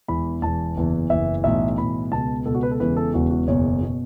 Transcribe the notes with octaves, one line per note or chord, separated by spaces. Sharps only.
E1 E2 E3 B5
E1 E2 E3 A5
F#1 E2 E3
F#1 E2 E3 E5
B1 A2 E3 E5
B1 A2 E3 B5
C#2 B2 A5
C#2 B2 A4
F#4
B4
A4
E1 E2 C#3 E3 B4
A4
E1 E2 C#3 E3 F#4
F#4
F#1 E2 B2 C#5
B2